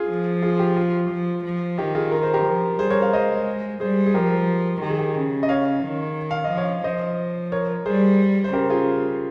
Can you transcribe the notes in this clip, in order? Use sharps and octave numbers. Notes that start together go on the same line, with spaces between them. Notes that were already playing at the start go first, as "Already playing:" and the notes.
Already playing: F4 G#4
F3
F4 G#4
G4
F4
F3
F3
D#3 G4
F4 G#4
A#4
C5
G4 A#4
F3
G3 G#4 C5
A#4 C#5
C#5 F5
G#3 C5 D#5
G3 G#4 C5
G#4
F3 G4 A#4
D#3 G4
G#4
G4
C#3
D#5
C#5 F5
D#3
F5
D#5
F3
C#5 F5
F3 C5 D#5
A#4 C#5
G3 G#4 C5
C5
C#3 G4 A#4
F4 G#4